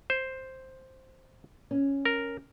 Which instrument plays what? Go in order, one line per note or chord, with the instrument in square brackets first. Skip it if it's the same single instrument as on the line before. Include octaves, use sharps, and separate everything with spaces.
[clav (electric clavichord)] C5
[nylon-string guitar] C#4
[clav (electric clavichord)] A#4